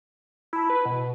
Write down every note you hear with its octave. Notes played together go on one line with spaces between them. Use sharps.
E4 A5 B5
B4
B2